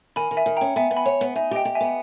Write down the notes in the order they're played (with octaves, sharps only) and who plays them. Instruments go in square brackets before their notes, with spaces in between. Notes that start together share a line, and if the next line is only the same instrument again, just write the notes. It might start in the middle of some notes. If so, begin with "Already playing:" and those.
[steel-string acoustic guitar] D#3 [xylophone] G#5 B5
[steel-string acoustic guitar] D#3
[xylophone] E5 G#5
[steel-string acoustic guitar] D#3
[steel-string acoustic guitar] C#4 [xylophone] G5 A#5
[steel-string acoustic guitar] B3 [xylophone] E5 G#5
[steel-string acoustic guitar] B3
[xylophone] G#5 B5
[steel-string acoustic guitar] C#5
B3
[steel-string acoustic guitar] D#4 [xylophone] E5 G#5
[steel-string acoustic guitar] G4 [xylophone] D#5 G5
[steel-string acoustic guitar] G4
[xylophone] E5 G#5
[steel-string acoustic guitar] B3